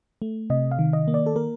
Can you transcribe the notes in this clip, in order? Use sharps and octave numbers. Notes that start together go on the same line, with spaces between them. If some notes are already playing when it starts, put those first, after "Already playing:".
A3
C3 D#5
F5
D#3
D#5
A#3
D5
A4
A#3 A#4